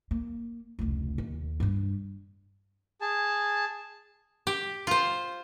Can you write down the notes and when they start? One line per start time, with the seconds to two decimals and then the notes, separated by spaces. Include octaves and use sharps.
0.11 A#3
0.79 F1 C#2
1.18 D#2
1.60 G2 G3
3.01 G#4 A5
4.47 G4
4.87 F4 C5